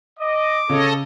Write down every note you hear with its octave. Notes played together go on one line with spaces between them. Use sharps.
D#5 D6
C#3 A4 C#5 D#5